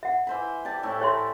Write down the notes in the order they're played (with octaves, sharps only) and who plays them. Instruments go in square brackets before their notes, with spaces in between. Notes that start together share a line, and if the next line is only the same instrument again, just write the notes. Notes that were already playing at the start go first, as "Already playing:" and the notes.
[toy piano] E5 F#5
[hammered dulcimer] E3 C5 B5
G4 D5 A5
A2 A3 E4
[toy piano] C#5 E5 C6